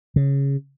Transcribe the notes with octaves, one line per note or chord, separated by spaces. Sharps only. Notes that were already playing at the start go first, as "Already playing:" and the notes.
C#3